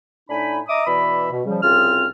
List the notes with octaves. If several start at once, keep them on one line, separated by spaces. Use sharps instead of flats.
A2 D4 D#4 G#5 B5
D#5 E5 A#5 D6 D#6
B2 E3 D5 E5 B5
B2
C#3 F3 G3
C2 C#3 C4 F4 F6